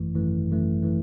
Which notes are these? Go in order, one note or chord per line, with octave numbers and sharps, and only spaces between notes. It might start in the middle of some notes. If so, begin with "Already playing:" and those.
Already playing: G#1 F#2 E3 A3
G#1 F#2 E3 A3
G#1 F#2 E3 A3
E3 A3